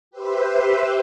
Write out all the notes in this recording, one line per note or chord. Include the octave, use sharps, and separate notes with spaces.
G4 B4 C5 E5